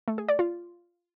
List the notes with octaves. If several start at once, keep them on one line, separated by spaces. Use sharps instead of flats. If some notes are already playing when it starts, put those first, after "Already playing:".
A3
G#4
D5
F4